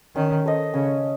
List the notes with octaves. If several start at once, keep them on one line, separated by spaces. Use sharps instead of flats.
D#3 C#4
A4 C5 D#5
C#3 C#4